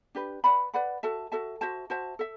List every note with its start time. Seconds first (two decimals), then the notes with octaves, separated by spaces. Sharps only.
0.15 D4 G4 B4
0.44 B4 D5 F#5 B5
0.74 B4 D5 F#5 B5
1.03 F#4 A4 E5 A5
1.32 F#4 A4 E5 A5
1.61 F#4 C5 E5 A5
1.90 F#4 C5 E5 A5
2.19 A4 E5